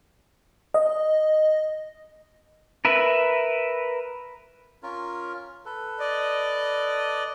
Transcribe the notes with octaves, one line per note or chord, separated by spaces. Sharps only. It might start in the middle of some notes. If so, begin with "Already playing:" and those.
D#5
A#4 B4 E5
C#4 F4 A#4
A4 B4
D5 D#5